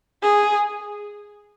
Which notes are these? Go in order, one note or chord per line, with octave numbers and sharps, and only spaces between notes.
G#4